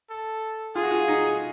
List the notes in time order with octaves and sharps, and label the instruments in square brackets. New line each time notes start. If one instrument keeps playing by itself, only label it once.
[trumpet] A4
[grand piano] F4 [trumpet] G#4
[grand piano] F#4
F4
D#4